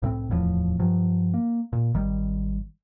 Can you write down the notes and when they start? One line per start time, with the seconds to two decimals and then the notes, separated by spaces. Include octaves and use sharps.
0.02 C2 A2 G3 C4
0.30 D1 E2 A2 F3
0.79 G2 F3 F#3
1.34 A#3
1.73 A#2
1.94 G#1 D#3 G3